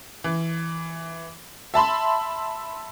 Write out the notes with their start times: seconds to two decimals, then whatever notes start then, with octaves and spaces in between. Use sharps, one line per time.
0.24 E3
1.74 E5 A5 B5 C6